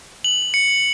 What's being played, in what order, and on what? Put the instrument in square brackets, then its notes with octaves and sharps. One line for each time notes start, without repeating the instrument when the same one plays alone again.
[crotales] F#7
C#7